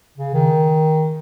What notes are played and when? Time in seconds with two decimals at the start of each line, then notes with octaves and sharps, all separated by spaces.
0.18 C#3
0.34 D#3